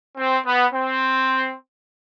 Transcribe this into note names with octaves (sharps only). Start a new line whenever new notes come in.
C4
B3
C4